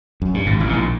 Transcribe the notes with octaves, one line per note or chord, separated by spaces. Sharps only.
F#2
G2
G#1 G#2
A1 A2
B2
A#1 A#2